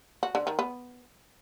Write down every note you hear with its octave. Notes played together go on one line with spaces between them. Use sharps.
F#4
D3
D#3
B3